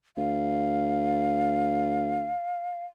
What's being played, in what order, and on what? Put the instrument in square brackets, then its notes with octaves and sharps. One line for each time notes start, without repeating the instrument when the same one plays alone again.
[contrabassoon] D2 [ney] F5